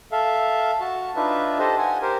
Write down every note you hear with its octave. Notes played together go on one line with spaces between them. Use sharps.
A4 E5 F5
F#4 A5
D4 D#4 F4 B4 E5
G4 A4 C5 D#5
F#5 G#5
G4 A#4 C5